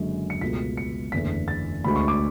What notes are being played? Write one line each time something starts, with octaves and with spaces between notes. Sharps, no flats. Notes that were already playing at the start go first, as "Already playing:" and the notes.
Already playing: F#1 F#2 D3 G#3
C#7
C#2 B2 A3 B6
C#7
F#1 E2 D3 A3 B6
A6
D2 D3 G#3 B5
C#6
D6